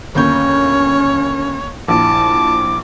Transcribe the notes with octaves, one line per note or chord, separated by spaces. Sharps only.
G1 D#2 C#4 C#5 G6
A#1 E4 A5 D6